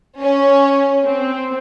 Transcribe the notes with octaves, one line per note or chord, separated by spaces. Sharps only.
C#4
C4